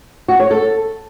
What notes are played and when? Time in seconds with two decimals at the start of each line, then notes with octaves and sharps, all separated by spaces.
0.28 F#4
0.40 C#5
0.51 A4